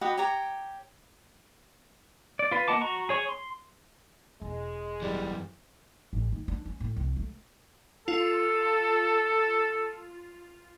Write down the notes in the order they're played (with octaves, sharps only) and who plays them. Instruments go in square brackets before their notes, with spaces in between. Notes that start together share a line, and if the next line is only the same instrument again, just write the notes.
[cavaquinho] F#4 G4 B4 D#5
G4 C#5 A#5 D6
[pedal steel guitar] D5
F4 B4
A#3 D#5 F#5 A5 D6
F#4 A#5 C#6
G#4 C#5 C#6
C6
[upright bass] E1 [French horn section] G#3
[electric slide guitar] F#2 E3 [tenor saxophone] G3
[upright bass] A1
D#3
D4
C#4
A2
C2
A3
[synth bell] F4 [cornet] A4